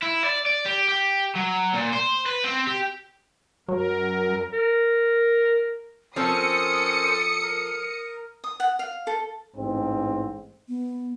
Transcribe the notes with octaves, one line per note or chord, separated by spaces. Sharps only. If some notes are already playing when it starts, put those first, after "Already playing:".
E4
D5
D5
G4
G4
F#3
A#2
C5
B4
C4
G4
F#2 F#3 A#4
A#4
F3 C4 C#4 A4 A#4 C5 D#6 C#7
A#4
D#6
F#5
F5
A4
A1 G#2 C4
B3